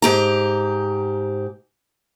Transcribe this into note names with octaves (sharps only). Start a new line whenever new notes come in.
G#2 G4 A#5